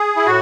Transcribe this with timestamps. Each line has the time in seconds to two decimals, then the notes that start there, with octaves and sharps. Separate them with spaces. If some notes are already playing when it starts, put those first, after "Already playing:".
Already playing: G#4
0.16 E4
0.26 A2 F#4